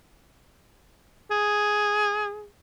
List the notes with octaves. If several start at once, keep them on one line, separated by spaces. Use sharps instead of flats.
G#4